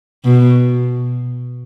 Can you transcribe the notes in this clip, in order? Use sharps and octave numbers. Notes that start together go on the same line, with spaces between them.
B2